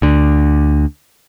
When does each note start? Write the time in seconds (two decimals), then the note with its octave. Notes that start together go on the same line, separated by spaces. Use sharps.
0.02 D2 D3